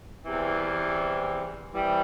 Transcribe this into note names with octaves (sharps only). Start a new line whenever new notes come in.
E2 C3 E3 G3 C4
C3 E3 G3